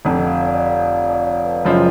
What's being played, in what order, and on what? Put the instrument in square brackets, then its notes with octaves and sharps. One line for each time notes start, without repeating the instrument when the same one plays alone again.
[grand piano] F1 F2 D3 [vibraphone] F#5
[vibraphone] F5
C#5
D5
D5
F5
D5
D5
C#5
B4
[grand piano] F#1 F#2 F3 G#3 [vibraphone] C#5